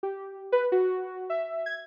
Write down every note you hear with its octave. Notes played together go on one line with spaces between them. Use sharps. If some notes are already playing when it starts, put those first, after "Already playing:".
G4
B4
F#4
E5
G#6